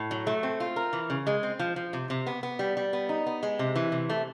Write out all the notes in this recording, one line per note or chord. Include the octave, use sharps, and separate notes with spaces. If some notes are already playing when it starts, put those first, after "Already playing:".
Already playing: A2
F#3
A3
C4
F4
A#4
E3
C#3
G#3
C4
F3
F3
C3
C3
B3
B3
G3
G3
B3
D#4
B3
G#3
C3
E3
C3
A3